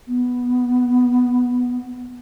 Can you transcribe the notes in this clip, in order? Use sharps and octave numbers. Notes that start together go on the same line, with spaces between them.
B3